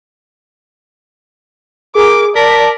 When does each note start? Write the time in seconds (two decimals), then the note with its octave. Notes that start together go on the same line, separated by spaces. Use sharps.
1.95 G#4 A#4 D6
2.35 A#4 D5 A5 B6